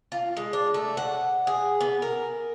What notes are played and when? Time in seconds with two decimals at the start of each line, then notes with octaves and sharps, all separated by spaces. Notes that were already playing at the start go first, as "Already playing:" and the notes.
0.12 F4
0.37 G#3
0.53 D4
0.74 A3
0.97 F#5
1.47 G#4
1.81 B3
2.02 A#4